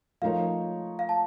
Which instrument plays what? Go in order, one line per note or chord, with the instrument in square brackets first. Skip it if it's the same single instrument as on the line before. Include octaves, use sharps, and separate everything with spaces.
[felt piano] F3 A3 D#4 A#4 C#5 [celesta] F5
[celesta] F5
A5